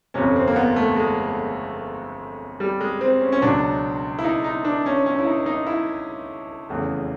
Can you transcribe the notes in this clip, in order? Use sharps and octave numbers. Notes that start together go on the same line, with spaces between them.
G1 F2 C3 C#4
C4
A#3
B3
A3
G#3
G3
G#3
C4
C#4
C#4
C#2 B2 F#3 D4
E4
D#4
D#4
D4
C#4
C#4
E4
D#4
D#4
E4
F1 E2 C#3